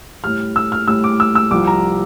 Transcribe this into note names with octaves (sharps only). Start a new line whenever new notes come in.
A2 G3 F6
E6
F6
A2 G3 E6
D6
E6
E6
C2 C3 F3 D6
A#5